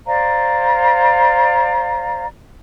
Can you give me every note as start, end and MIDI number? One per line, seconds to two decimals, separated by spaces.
0.07 2.25 72
0.07 2.25 74
0.07 2.25 77
0.07 2.25 82